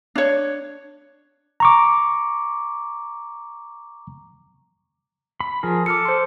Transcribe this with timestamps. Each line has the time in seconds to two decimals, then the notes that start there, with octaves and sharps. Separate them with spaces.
0.15 D4 C#5
1.60 A#5 C#6 D6
5.40 B5
5.63 F3 G#4 A#4
5.86 A4 D6 F6 C#7
6.05 C5 C6